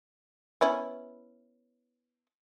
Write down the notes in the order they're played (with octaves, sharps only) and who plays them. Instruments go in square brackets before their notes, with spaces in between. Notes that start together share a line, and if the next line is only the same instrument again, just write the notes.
[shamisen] B3 C#4 E4